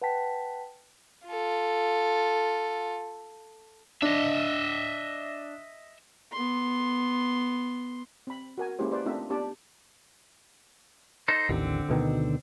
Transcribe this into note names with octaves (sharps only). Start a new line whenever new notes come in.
B4 F#5 G5 A5 B6
F4 A4
D4 D#5 E5
B3 C6
C4 B5
F#4 A#4 G#5
G#3 A#3 C#4 E4 G4 C5
G4 B4 C5 D5
A3 C4 D4 D#4 F4 E5
B3 D4 G4 D5 A5
D#4 A4 C5
A1 D#2 D3 C4
D2 B2 D#3